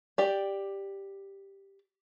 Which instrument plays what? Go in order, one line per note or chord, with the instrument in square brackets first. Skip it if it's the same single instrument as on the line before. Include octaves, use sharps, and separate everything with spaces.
[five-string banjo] G4 D5